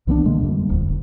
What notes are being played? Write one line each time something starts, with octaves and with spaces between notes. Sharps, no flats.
C2 E3 B3 D4
B2 D3 G#3 A#3
F#2 D3 G3
D1 F2
F#1